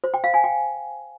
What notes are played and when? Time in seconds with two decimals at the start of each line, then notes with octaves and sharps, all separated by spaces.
0.04 C5
0.14 G5
0.24 F5
0.34 G#5
0.44 G5